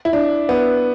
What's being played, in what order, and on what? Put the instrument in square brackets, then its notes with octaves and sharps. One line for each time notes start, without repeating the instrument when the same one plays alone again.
[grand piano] E4
D4
B3